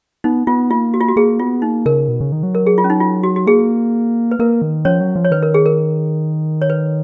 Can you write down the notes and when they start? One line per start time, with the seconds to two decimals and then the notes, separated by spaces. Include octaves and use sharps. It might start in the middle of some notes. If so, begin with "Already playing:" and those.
0.24 B3 D#4
0.47 B3 F4
0.70 A#3 F4
0.94 F#4
1.01 F4
1.08 F#4
1.16 A#3 G#4
1.39 B3 F4
1.62 A#3 D#4
1.86 C#3 A#4
2.08 B2
2.20 C#3
2.32 D#3
2.43 F#3
2.55 A#4
2.66 G#4
2.78 F4
2.84 C#4
2.90 D#4
3.00 F4
3.23 F#4
3.36 F#4
3.47 A#3 G#4
4.31 B4
4.39 A#3 A#4
4.62 D#3
4.85 F3 C#4 C#5
5.01 F#3
5.16 F3
5.24 C#5
5.31 D#3 B4
5.42 A#4
5.54 G#4
5.66 A#4
6.62 C#5
6.70 B4